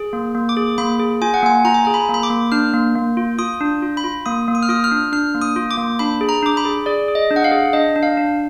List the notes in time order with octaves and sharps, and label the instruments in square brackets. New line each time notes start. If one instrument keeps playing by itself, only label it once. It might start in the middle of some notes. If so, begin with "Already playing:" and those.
Already playing: [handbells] G#4
A#3
A#3
D6
G#4
A#3 B5
G#4
F4 G#5
F#5
A#3 G#5
F4 A#5
G#5
G#4 A#5
B5
A#3
B5
D6
A#3
D4 F6
A#3
A#3
F4
F4 D#6
D4
F4
B5
F4
A#3 D#6
A#3
D#6
F6
F4 D#6
F6
D4
D4 F6
A#3
D#6
F4
D6
A#3
D4 B5
G#4
A#5
D4 D6
B5
G#4
G#4 D5
G#4
D#5
D4
F#5
F5
G#4
D4 D#5
D4
F5
D4